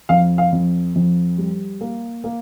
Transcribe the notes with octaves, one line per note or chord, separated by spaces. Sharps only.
F2 F5
F5
F2
F2
G3
A#3
A#3